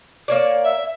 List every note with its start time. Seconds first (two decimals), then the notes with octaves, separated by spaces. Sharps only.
0.28 A#3 C#5 D5
0.64 E5